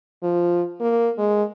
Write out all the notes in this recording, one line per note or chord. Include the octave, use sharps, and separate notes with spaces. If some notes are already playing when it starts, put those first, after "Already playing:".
F3
A#3
G#3